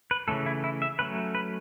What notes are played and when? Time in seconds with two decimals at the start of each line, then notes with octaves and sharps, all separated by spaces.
0.11 B4
0.28 C#3 E3 A3 C#4 A4
0.46 E4
0.64 E4
0.82 E5
0.99 F#3 A3 C#4 B4
1.35 B4